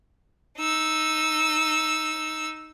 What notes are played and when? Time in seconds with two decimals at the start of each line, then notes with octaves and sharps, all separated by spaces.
0.58 D#4 E6